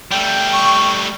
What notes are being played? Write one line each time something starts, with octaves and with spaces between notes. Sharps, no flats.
G3 A3 G5
C#6